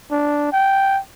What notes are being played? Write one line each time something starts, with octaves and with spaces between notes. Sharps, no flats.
D4
G5